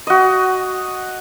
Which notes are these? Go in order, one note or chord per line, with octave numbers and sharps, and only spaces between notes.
F#4 D#5